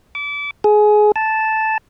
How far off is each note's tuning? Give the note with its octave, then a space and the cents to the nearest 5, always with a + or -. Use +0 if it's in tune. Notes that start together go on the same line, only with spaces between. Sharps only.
D6 -30
G#4 +20
A5 -5